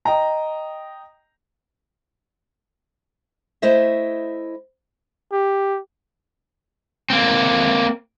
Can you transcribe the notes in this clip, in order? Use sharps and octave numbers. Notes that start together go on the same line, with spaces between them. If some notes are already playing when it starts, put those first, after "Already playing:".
D#5 G5 A#5
A3 E4 C5 D#5 E5
G4
A#3 C4